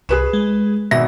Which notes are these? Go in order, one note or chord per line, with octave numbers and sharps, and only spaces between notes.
C2 G#4 B4 E7
G#3
G#1 B2 E5 A#6